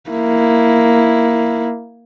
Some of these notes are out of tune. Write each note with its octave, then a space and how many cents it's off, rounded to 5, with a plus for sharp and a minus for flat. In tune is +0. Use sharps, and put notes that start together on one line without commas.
A#3 +0 E4 +0